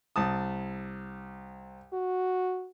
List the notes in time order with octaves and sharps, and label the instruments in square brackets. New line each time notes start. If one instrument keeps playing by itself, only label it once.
[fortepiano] C2 A5 D#6
[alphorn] F#4